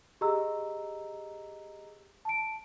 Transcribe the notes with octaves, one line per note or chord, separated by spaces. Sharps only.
G4 G#4 D#5 A#5 E6
A5 D7